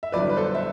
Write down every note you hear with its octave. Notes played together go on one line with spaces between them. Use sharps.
E5
G1 F#2 E3 B4 D5
B4
A4 C5
E5